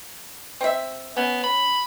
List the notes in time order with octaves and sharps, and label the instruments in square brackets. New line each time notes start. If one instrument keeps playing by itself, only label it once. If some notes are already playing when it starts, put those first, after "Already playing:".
[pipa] C4 E5
[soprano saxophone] B3 [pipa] C#4
[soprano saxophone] B5